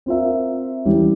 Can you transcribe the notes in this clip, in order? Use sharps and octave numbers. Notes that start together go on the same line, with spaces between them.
C4 F4 A#4 E5
E3 G3 C#4 G4